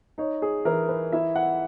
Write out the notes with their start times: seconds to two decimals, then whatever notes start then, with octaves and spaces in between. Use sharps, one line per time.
0.18 D#4 C#5
0.42 G#4
0.65 E3 A#4
0.89 B4
1.12 E4 E5
1.35 F#5